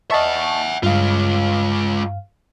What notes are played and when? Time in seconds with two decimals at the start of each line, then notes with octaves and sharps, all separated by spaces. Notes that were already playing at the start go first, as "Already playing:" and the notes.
0.11 D#5 E5 F#5 A5 C#6
0.83 G2 G#3 F4 F5